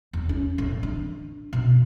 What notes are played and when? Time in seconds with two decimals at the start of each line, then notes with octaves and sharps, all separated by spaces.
0.13 E2
0.29 C#4
0.58 A1
0.83 D4
1.53 B2